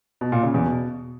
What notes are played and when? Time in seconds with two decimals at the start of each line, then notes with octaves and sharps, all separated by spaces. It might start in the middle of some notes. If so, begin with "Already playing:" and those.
0.21 B2
0.32 A#2
0.43 C#3
0.54 E2
0.65 B2